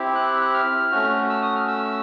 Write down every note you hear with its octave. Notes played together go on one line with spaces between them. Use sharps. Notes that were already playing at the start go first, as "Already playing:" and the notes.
Already playing: C4 E4 G4
F#6
F#6
F6
A3 C#4 F#4
E6
D#6
F6
E6